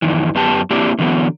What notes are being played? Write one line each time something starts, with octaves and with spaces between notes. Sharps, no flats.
F2 D#3 E3
F#2 B3 G4 A5
A#3 C4 D4 E4 G4
D3 E3 F#3 B3